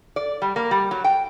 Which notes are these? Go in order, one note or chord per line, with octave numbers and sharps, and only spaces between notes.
D5
G3
A#3
G3
F#3
G5